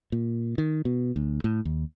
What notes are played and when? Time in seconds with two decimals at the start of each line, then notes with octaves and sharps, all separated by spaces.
0.12 A#2
0.58 D#3
0.85 B2
1.16 D2
1.44 A2
1.65 D#2